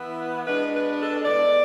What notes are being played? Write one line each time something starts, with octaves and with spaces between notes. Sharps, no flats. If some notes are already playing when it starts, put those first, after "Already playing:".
Already playing: E3 B3 E4
B2 G#3 D4 B4
B4
A4
A2 G#3 B3 D5